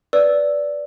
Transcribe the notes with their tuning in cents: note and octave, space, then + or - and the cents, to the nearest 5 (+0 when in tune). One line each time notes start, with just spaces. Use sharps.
B4 +0 D5 -10 E6 +0